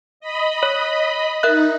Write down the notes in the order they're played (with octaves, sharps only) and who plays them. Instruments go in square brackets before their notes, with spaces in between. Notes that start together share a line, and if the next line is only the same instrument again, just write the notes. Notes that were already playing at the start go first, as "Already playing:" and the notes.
[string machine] D#5 B5
[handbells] C#5
[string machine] D#4 [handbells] A#4 E5 F#6